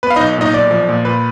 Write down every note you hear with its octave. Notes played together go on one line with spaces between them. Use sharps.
B3 B4
F5
B1 D#4 D#5
A#2 D#4 D#5
B1 D5
F3
A#2
A#2 B4